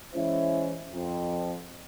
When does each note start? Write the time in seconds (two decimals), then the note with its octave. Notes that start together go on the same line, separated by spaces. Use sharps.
0.15 E3 G#3 C#4 E4 C5 E5
0.93 F2